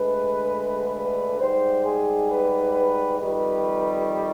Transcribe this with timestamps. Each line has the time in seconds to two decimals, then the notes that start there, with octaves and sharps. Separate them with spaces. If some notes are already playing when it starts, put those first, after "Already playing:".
Already playing: D2 D3 G#3 B4
0.96 B4
1.40 G#2 G3 C5
1.86 G#4
2.30 B4
2.75 B4
3.20 F2 D#3 G3 B4